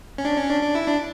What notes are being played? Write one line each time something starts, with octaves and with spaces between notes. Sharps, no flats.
C#4
D4
C#4
D4
D4
E4
D4